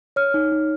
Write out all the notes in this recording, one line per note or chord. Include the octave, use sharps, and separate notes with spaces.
C#5 F6
D#4
D#4